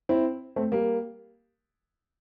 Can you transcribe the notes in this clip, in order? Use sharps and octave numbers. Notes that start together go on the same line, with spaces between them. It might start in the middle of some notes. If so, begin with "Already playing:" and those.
C4 E4
A3 C4
G3 A#3